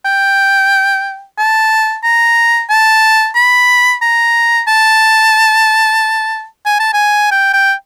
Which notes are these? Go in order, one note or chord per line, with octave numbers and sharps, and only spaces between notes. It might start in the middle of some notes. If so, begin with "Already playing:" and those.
G5
A5
A#5
A5
B5
A#5
A5
G#5
A5
G#5
G5
G5